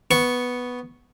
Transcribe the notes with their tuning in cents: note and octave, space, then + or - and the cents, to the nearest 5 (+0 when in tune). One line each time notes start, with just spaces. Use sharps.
B3 +0 C#6 +0